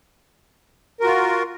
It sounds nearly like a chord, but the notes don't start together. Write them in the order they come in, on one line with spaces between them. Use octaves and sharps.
A#4 F#4 F4